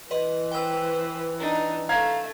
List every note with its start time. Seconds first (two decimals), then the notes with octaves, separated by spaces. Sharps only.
0.11 E3 B4 D#5 C6
0.51 B4 C5 G5 E6
1.38 D4 D#4
1.89 A3 F5 A#5 G#6